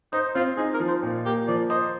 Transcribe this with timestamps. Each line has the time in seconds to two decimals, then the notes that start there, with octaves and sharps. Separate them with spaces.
0.13 D#4 C5
0.35 C4 F4
0.57 D#4 G#4
0.74 A#4
0.80 F3
0.88 C5
1.02 A#2
1.25 A#3 G4
1.48 F3 D5
1.70 C5 D#5